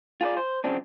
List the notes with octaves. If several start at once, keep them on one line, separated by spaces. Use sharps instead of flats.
F4 G#4 B4 D5
C5
F#2 C#3 F3 C4 D4